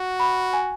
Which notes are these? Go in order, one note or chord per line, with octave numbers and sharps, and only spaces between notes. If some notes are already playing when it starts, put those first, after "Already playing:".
Already playing: F#4
B5
G#5